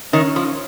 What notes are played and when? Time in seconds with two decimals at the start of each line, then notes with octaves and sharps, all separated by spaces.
0.13 D#3 C#4
0.36 F3